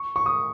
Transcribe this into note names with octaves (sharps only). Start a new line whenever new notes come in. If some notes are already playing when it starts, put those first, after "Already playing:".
Already playing: C#6
C#6
D#6